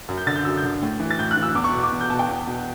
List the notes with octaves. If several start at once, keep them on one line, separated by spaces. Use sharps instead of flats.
F#2
G6
D3 A6
G6
F#2 E6
G6
D3
A2
E3
A6
A2 G6
F#6
E3
E6
E2 D6
C#6
B2
D6
E2
G6
B2 A5
G5
E2
B2